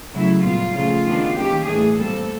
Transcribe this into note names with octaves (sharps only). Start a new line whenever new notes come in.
C#3 F#3 A3 E4
A#2 G3 B3 F4
C#3 F3 A3 F4
D#3 G#3 B3 D4
D#3 G3 A#3 C#4 G4
A2 E3 A3 D4 G#4
A#2 G3 C4 A4